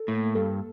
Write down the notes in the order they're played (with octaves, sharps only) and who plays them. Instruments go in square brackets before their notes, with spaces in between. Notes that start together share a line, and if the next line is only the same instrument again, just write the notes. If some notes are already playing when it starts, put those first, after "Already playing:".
Already playing: [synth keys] A4
[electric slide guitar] A2 [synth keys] A#3
[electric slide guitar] G2 [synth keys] A4